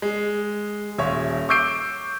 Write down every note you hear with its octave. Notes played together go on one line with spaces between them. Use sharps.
G#3
D#1 C#4 C#5 E5
C#6 D6 E6 G6 C7 D7